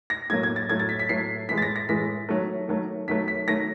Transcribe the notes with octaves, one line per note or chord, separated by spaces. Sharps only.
A#6
A2 F#3 A#3 G#6
G#6
A6
A2 F#3 A3 G#6
A6
B6
B6
A2 F#3 A3 C7
A2 E3 G#3 B6
A6
A#6
A#6
A2 E3 G#3 B6
D#3 F#3 A3
D#3 F#3 A3
D#3 F#3 A3 B6
B6
D#3 F#3 A3 A#6